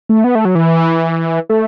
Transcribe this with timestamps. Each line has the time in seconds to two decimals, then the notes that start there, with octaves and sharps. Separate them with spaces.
0.09 A3
0.24 B3
0.35 A3
0.45 F#3
0.55 E3
1.49 A3